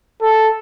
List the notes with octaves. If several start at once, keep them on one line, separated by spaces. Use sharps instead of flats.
A4